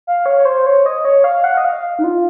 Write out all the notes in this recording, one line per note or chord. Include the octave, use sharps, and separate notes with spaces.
F5
C#5
C#5
C5
C#5
D#5
C#5
F5
F#5
D#5
F5
D#4
F4